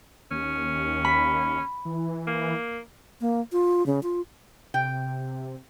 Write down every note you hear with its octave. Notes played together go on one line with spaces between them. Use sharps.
D#2 C#4
B5
E3
A#3
A#3
F4
C#3
F4
C3 G5